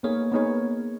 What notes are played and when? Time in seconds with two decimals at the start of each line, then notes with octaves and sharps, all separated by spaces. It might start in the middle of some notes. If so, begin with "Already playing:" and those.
0.03 A#3 B3 D#4 G#4 C#5
0.32 B3 D#4 G#4 C#5